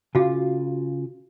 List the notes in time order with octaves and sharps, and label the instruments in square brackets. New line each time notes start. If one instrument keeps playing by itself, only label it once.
[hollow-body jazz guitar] C#3 F4 [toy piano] F#4 G#4 F5